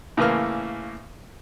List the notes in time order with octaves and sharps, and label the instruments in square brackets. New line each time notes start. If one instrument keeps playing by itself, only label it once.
[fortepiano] A2 C#3 E3 A#3 F6